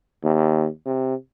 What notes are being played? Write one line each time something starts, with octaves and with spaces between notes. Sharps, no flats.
D#2
C3